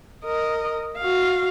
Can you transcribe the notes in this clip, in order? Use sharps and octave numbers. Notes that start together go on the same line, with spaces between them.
A#4 D#5
F#4 F5